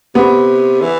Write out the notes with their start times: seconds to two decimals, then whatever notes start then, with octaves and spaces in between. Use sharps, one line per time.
0.15 C3 B3
0.82 E3